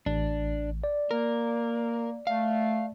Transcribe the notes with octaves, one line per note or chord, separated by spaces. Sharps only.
A1 D4
D5
A#3 A#4
A3 F5